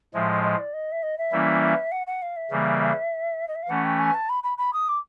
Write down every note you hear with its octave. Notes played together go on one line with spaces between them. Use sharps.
A2 F3 G#3 E5
D#5
D#5
D5
D#5
E5
D#5
E5
E3 G3 A#3 C#4 E4
F#5
F#5
F5
E5
C#3 E3 G3 A#3
D#5
E5
F5
E3 A3 C#4 F#5
G5
G#5
A5
B5
B5
B5
D#6
D6